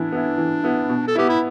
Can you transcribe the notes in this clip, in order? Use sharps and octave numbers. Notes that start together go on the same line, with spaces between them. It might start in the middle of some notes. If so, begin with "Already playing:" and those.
Already playing: E3 B3 D4 E4
B3 E4
E3
B3 E4
B2
A4
B3 E4 G4
E4